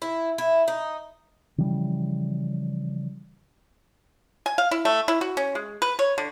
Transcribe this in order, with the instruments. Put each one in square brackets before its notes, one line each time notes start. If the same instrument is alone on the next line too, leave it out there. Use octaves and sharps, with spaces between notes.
[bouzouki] E4
E4
D#4
[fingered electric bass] C#3 E3 F3 G3
[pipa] G#5
F5
E4
A3
E4
F#4
C#4
G#3
B4
C#5
D3